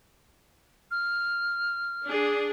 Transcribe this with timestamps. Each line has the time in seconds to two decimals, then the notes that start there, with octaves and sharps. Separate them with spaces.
0.91 F6
2.04 D4 G#4